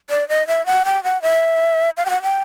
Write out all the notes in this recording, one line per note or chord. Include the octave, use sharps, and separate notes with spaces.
D5
D#5
E5
F#5
G5
F#5
E5
F5
G5
F#5
G5